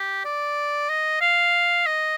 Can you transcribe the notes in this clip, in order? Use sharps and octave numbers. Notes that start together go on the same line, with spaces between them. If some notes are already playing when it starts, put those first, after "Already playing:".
Already playing: G4
D5
D#5
F5
D#5